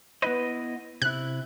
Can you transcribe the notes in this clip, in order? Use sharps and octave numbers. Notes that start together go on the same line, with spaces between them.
B3 E4 B4 D#5
C3 E4 F#6